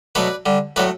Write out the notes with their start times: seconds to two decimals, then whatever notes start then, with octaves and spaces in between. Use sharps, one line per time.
0.15 B2 F#3 A3 B4 D5
0.46 D3 G3
0.76 A2 F#3 A3 B4 D5